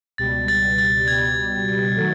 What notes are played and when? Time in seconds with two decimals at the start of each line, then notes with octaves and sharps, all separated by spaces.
0.18 C#2 B2 G3 A6
0.48 A6
0.78 A6
1.08 C#2 B2 G3 G#6
1.96 D#3 F#3 A3